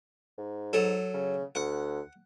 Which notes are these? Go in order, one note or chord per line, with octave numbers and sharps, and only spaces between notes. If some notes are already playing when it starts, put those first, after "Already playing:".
G#2
F#3 A4
C#3
D2 F#5